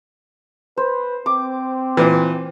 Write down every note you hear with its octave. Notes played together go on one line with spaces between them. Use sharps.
B4 C5
C4 D6
A#2 E3